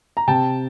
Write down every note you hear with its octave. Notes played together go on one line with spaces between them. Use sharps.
A#5
C3 G5 A5